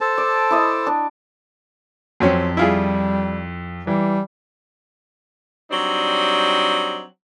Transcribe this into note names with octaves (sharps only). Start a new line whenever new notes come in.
A4 C5 A5
D5
E4 D5 D#5
D4
F2 F#3 C4 C#4
G3 E4 F4 G#4
E3 G3
F#3 G3 C4 D4 D#4